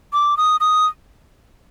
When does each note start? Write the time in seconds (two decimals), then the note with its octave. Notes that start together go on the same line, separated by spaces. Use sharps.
0.13 D6
0.37 D#6
0.60 D#6